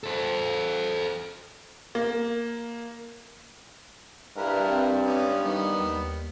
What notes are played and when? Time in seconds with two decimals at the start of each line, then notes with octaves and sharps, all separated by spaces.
0.03 A4 C5
1.95 A#3
4.38 G2 E4 A#4 B4
4.68 C4
5.05 B3 C#4 D5
5.44 D#3 G3 B3
5.81 D#2